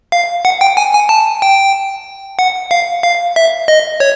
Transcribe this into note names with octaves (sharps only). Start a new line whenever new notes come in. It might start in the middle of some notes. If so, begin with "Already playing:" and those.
F5
F#5
G5
G#5
G#5
A5
G5
F#5
F5
F5
E5
D#5
C#5